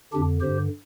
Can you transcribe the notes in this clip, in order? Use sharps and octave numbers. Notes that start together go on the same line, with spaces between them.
F2 D3 D4 G4
G2 D3 G4 C5